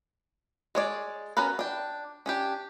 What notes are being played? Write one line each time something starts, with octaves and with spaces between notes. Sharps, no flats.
G#3 C#5 D5
B3 C#4 F#4 A#4 B4
D4 G5
C#4 D4 G4